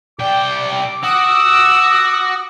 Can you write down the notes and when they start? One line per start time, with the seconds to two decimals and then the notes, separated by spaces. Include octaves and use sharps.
0.19 C2 D5 G5 D6
1.03 F#4 D#6 E6